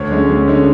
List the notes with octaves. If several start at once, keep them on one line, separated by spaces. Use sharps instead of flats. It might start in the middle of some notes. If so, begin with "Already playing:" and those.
Already playing: D2 C#5
D3 G#3 C#4
D2
D3 G#3 C#4